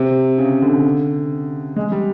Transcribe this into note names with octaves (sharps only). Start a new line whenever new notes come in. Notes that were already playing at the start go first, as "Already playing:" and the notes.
Already playing: C3
C#3
D3
G#3
G3